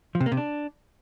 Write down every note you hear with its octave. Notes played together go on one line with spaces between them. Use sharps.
F3
C3
A#3
C3
D4